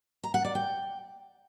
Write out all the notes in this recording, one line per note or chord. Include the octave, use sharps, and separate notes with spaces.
A#5
F#5
D5
G5